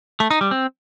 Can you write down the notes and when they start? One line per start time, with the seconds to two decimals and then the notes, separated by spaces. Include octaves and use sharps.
0.20 A3
0.31 D#4
0.41 G3
0.51 C4